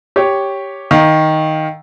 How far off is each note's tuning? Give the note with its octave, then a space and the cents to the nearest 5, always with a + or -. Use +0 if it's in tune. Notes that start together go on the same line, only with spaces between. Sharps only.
G4 +0 C#5 +0
D#3 +5 F5 +10